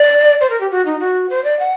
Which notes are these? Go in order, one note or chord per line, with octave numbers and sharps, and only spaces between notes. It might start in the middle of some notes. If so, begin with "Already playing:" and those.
Already playing: D5
C5
A#4
G4
F#4
D#4
F#4
C5
D5
F#5